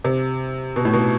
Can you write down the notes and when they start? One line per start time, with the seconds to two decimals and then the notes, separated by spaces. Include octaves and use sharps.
0.04 C3
0.76 B2
0.85 A2
0.93 B2